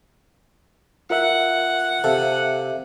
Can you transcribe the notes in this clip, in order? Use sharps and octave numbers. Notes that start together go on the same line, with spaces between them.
F4 A#4 E5 F#5
C3 A4 E5 F5